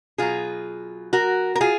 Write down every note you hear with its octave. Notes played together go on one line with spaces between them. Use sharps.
B2 F#3 F4 G#4
F#4 A#4
A#4
F4 G#4